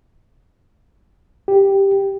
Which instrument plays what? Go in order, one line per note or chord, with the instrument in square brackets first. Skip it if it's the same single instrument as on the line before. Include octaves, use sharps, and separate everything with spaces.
[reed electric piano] G4